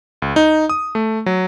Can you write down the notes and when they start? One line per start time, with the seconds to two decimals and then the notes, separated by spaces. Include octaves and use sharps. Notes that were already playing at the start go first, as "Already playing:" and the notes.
0.22 C#2
0.36 D#4
0.69 D#6
0.95 A3
1.26 F#3